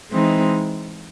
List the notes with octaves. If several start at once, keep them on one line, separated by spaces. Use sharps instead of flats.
E3 G#3 C4 D#4